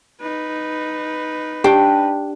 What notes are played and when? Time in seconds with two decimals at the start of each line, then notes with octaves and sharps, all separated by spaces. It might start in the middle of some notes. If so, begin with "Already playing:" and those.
0.21 D#4 B4
1.64 D4 G4 G5